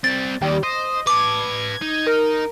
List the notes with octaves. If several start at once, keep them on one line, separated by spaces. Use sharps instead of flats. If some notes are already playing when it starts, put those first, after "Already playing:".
G3 C4 A6
D#2 D#3 G3
C5 D#5
B4 A5 D6 G#6
D#4
A#4